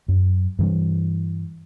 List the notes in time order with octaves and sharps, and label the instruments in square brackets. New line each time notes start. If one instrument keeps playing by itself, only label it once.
[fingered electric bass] F#2
G2 E3 G3